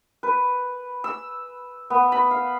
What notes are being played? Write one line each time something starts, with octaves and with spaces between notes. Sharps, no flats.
B4
E6
B3
B5
F5